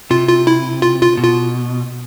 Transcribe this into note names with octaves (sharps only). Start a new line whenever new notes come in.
C3 F4
F4
E4
F4
F4
B2
F4